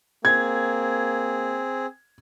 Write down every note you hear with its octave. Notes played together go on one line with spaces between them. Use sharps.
A#3 C4 G#4 G#6